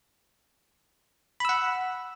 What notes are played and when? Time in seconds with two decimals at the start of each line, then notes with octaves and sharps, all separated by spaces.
1.40 B5
1.45 E6
1.49 F#5